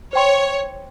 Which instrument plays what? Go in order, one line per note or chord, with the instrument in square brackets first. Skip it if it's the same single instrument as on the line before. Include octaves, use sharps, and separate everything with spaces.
[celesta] C5 G5 C6 [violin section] C#5